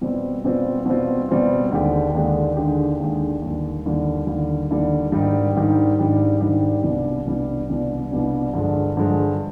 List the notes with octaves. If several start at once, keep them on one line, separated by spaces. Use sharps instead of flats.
B2 G3 C4 F4
B2 G3 C4 F4
B2 G3 C4 F4
B2 G3 C4 F4
D#2 D3 G#3 D4 G4
D#2 D3 G#3 D4 G4
D#2 D3 G#3 D4 G4
D#2 D3 G#3 D4 G4
D#2 D3 G3
D#2 D3 G3
D#2 D3 G3
D#2 D3 G3
G#2 D#3 G3 D4 G4
G#2 D#3 G3 D4 G4
G#2 D#3 G3 D4 G4
G#2 D#3 G3 D4 G4
C2 B2 G3 D4
C2 B2 G3 D4
C2 B2 G3 D4
C2 B2 G3 D4
G2 D3 F3 G#3
G2 D3 F3 G#3